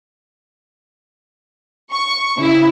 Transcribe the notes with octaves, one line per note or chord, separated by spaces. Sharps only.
C#6
C#3 E4